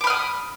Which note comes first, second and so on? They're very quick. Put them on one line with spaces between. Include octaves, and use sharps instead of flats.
D6 B5 F6 D#6